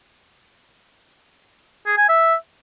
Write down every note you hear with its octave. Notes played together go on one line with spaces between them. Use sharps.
G#4
G#5
E5